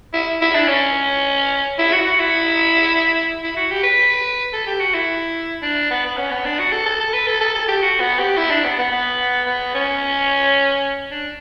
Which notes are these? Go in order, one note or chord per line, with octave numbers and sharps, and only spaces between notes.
E4
E4
D4
C#4
E4
F#4
F#4
E4
E4
F#4
G4
B4
A4
G4
F#4
E4
D4
B3
B3
C#4
B3
D4
F#4
A4
A4
A4
B4
A4
A4
A4
G4
F#4
B3
G4
E4
D4
B3
B3
B3
B3
C#4
D4